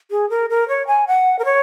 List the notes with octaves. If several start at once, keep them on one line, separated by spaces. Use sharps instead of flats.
G#4
A#4
A#4
C#5
G#5
F#5
A#4
C#5